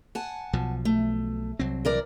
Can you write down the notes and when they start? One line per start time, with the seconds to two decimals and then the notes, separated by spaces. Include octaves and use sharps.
0.15 F#5 G#5 A5
0.53 B1 B2 F3
0.85 A3
1.59 C2 F#3 C4
1.85 E3 A#4 D5